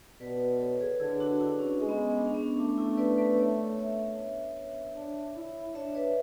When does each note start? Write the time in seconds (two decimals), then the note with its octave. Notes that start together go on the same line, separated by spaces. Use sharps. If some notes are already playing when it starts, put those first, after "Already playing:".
0.20 B2 B4 D5
0.40 B4 D5
0.60 A4 C#5
0.80 G#4 B4
0.99 D3 E4 G#4
1.14 G#4
1.20 D4 F#4
1.40 E4
1.59 C#4
1.79 G#3 C#4
1.89 B3
2.07 B3
2.18 D4
2.26 C#4
2.34 B3
2.43 C#4
2.58 A3 D4
2.78 E4
2.97 B4 D5
3.18 B4 D5
3.37 C#5 E5
3.77 C#5 E5
4.95 D4
5.36 E4
5.74 D4 C#5 E5
5.95 B4 D5